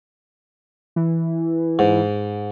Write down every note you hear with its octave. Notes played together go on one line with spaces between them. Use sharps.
E3
G#2